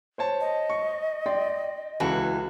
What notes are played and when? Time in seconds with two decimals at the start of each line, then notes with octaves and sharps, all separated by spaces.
0.18 C5 C#5 A5
0.40 D#5
0.70 C#6
1.26 D5 G5 C6
2.00 C#2 E3 F#4 A4